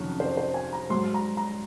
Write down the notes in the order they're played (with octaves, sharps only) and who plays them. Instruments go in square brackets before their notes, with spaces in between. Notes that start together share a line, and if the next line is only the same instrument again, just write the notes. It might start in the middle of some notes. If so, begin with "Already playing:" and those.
Already playing: [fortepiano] F2 C3 D#3 F#3 C#4
C5
C5
G#5
A#5
G#2 F#3 C6
A#5
A#5